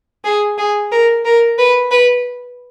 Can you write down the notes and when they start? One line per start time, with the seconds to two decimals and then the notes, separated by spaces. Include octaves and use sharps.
0.24 G#4
0.58 G#4
0.92 A#4
1.25 A#4
1.58 B4
1.91 B4